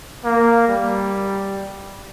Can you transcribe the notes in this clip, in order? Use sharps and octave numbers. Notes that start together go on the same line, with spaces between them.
A#3
G3